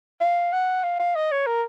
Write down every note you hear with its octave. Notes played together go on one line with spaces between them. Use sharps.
F5
F#5
F5
F5
D#5
C#5
A#4